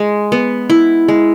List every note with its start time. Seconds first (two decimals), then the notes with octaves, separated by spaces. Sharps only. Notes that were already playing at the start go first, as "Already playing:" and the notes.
Already playing: G#3
0.32 B3
0.70 E4
1.08 G#3